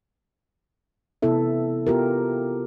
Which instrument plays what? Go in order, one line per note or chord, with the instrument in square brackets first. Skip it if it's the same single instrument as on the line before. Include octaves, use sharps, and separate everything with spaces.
[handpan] C3 B3 E4 A4 E5
B3 F4 G4 A#4